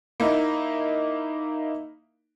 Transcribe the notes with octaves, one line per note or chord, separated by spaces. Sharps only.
A#3 D#4 E4